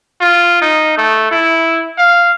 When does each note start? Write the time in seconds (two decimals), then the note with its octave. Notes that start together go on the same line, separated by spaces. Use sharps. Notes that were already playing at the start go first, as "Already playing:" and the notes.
0.21 F4
0.62 D#4
0.98 A3
1.31 E4
1.98 F5